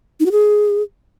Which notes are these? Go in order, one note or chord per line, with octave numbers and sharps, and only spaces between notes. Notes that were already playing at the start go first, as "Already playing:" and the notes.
D#4
F#4
G#4